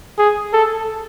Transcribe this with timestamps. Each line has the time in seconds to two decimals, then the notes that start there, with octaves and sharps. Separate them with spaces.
0.18 G#4
0.53 A4